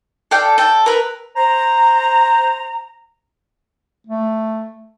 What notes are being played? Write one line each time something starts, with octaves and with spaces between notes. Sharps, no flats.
A4 D5 F5 G5
A4 G5
A#4 B4
C5 A#5
A3